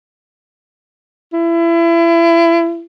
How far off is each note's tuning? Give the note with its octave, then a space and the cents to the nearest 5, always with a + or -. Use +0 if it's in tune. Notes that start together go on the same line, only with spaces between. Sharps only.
E4 +30